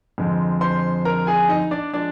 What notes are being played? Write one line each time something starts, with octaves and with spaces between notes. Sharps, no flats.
F2 D3 G#3 C4
C5 C6
A#4 A#5
G#4 G#5
D#4 D#5
D4 D5
F3 G#3 D4 D5